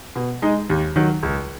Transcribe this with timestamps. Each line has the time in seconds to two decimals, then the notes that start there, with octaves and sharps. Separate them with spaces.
0.16 B2
0.42 G#3 D#4
0.70 D#2
0.96 D#3 F#3
1.23 C#2